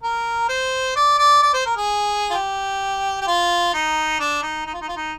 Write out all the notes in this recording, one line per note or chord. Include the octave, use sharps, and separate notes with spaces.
A#4
C5
D5
D5
D5
C5
A#4
G#4
F4
G4
G4
F4
D#4
D4
D#4
D#4
F4
D#4
F4
D#4